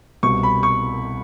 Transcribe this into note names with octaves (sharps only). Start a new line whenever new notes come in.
C2 B2 C#6
B5
C#6